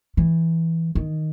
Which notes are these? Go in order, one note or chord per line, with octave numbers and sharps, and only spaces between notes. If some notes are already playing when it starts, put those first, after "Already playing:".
E3
D#3